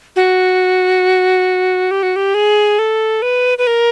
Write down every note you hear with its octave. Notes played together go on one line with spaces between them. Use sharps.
F#4
G4
F#4
G4
G#4
A4
B4
B4
A#4